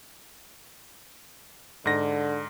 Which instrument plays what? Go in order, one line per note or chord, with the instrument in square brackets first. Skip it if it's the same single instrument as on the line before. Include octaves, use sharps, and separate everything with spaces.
[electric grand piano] G#2 A#6 [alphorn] D3